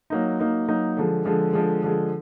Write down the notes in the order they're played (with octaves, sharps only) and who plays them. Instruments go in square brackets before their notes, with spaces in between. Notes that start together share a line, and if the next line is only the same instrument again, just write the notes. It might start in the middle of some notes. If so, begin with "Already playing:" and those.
[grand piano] F#3 A#3 D#4
F#3 A#3 D#4
F#3 A#3 D#4
D3 F3 G#3
D3 F3 G#3
D3 F3 G#3
D3 F3 G#3